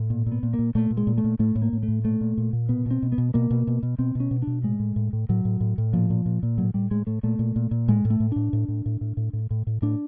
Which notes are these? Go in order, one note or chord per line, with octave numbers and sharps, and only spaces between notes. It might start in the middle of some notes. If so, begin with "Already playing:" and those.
Already playing: A2
A#2
A#2
B3
A#2
A#3
A#2
A#2 A3
A#2
G#3
A#2
A3
A#2
A2 A3
A2
A#3
A2
A3
A2
A#2 A3
A#2
A#2
A#2
B2 B3
B2 C4
B2
B3
B2
B2 A#3
B2
B2
B2
B2 C4
B2 C#4
B2
B2 D4
A2 G#3
A2
A2
A2
A2 F#3
A2
A2
A2
A#2 F3
A#2
A#2
A#2
A2 F#3
A2 G3
A2 G#3
A2 A3
A#2 A3
A#2
A#2
A#2
A2 G#3
A2
A3
A2
A2 D4
A2
A2
A2
A2
A2
A2
A2
A2
A2 D4